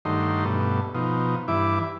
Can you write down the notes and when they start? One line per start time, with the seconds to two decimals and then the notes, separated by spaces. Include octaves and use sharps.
0.05 G2 D#3 F#3 A3 D#4 C6
0.45 G2 B2 A3
0.95 B2 F3 D#4
1.48 G2 E3 E4 D6